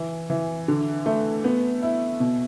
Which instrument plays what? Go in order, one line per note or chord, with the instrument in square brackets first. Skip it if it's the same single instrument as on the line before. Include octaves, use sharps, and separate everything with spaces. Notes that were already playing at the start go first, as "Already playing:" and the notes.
Already playing: [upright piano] E3
E3
D3
A3
B3
E4
B2